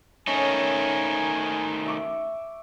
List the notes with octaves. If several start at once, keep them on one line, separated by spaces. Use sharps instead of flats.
D#3 A3 C#4 D#4 G#5
E5 C#6 D6